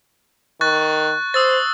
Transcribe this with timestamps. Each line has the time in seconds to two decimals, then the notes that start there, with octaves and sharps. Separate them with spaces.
0.61 D#3 C#6 F#6 A6
1.34 C5 D#6 E6 A6